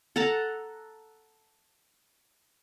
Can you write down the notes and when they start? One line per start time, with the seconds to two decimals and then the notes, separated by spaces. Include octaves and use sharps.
0.16 A4 F#5 A5 A#5